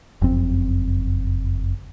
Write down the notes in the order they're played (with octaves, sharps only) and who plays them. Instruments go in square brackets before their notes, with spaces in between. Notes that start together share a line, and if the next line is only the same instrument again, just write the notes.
[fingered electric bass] F#1 F2 C4